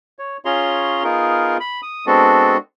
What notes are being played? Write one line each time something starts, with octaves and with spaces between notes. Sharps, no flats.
C#5
C#4 F4 G#4 C#5 A#5 C6
B3 D#4 F4 G#4 A#4
B5
D#6
G#3 B3 C4 D4 F#4 A4